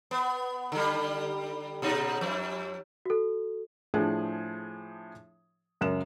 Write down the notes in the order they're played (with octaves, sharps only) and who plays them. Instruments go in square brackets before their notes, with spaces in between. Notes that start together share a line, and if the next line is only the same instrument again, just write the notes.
[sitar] B3
D3 G3
A#2 C#3 D#4
F2
[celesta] F#4 A4
[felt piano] A2 F3 D4 G#4
C#2 F#2 A#4 E7